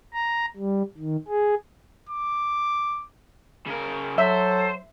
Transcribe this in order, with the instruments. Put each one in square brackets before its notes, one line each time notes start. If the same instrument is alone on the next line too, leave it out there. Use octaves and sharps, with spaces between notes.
[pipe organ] A#5
G3
D#3
G#4
[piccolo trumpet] D6
[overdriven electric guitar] C#3 A#4
[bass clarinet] F#3 [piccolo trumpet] A4 [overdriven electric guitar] C5 [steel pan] E5